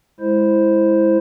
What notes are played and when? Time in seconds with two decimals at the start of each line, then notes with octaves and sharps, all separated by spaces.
0.20 G#3 E4 C5